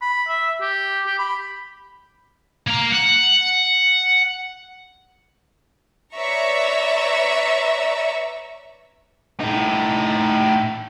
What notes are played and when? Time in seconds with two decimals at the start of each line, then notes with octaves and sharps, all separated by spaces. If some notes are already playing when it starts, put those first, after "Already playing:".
0.02 B5
0.28 E5
0.61 G4
1.07 G4
1.19 B5
2.67 A#3 A#5
2.92 F#5
6.14 B4 C#5 D5 E5 A#5 C#6
9.40 A2 D#4